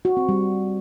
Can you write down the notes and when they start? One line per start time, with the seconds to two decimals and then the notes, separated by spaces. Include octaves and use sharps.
0.05 F#4
0.17 C4
0.29 G3